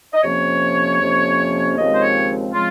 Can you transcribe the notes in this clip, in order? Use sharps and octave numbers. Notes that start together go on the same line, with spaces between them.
D#5
F2 C3 F3 A#3 C#4 C#5
F2 C3 F3 A#3 C#4
D#2 C#3 F3 G#3 C4 D#5
C5
C#5
C#3 F3 G#3 C4 F4